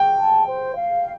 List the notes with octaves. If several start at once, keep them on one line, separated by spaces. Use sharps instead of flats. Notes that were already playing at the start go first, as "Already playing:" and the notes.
Already playing: G5
A5
C5
F5